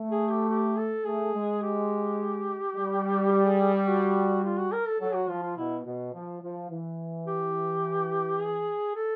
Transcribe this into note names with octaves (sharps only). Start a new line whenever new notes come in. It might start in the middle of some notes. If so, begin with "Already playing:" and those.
Already playing: A3
G#4
G4
G4
A4
A3 G#4
G#3
G4
G3
G4
G#4
G#4
G4
F#4
F4
F#4
A#4
A4
F#3 A4
F#4
F3 F4
F4
B2 E4
B2
F3
F3
E3
G4
G#4
A4